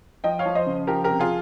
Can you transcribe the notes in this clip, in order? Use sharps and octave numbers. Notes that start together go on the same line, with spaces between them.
F3 D#5 G5
C#5 F5
F3
C5 D#5
C#3
F3 G4 A#4
G4 A#4
C3
F4 G#4